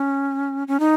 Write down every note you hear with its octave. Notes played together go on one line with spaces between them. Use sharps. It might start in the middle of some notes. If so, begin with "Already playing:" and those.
Already playing: C#4
C#4
D#4